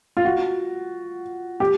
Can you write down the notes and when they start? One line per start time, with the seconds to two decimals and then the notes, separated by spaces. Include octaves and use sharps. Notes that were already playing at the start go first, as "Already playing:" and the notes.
0.17 F4
0.25 F#4
1.60 G4